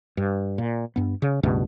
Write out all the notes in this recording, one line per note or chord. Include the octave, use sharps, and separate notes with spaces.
G2
A#2
G2 B3
C#3
C#2 G2 B2 A3